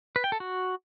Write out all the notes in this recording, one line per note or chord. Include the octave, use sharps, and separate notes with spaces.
B4
G5
A4
F#4